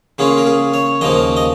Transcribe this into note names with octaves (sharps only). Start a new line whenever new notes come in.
C#3 A#3 C#4 F4 G#4
A#4
G#4
C#5
D#2 C#3 F3 A#3 D#5
D#5